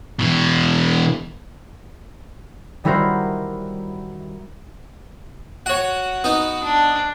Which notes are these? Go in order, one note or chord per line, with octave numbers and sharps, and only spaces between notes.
B2 E3
D#3 G3 E4 F#4 A#4 C5
F#4 C#5 F#5
B3 D#4
D4